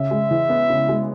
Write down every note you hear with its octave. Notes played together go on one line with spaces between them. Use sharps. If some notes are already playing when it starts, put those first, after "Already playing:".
Already playing: C#3 E5
G#3
E3
B3
C#3
G#3